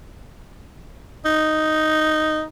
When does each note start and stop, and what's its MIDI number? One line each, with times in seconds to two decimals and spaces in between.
1.25 2.43 63